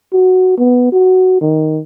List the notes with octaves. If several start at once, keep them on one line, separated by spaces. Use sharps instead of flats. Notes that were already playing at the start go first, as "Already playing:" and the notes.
F#4
B3
F#4
D#3